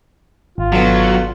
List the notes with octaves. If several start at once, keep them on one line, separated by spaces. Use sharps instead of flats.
G#1 F4
B2 D3 F#3